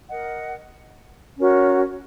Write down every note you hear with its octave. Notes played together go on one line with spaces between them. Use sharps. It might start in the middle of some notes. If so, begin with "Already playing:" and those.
A#4 D#5 F#5
C#4 F#4 A#4 C#5